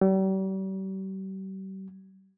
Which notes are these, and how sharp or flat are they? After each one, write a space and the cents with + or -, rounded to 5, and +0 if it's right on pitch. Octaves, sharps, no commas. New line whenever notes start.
G3 -40